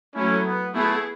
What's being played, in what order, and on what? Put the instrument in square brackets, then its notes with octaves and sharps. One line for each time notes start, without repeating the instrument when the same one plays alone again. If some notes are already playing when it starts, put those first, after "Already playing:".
[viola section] F#3 A3 E4 [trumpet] C#4
[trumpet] B3
[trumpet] A3 [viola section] B3 E4 G#4